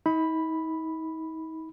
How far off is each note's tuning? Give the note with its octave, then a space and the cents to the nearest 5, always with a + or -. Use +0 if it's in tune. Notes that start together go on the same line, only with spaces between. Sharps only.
D#4 +40 B5 +0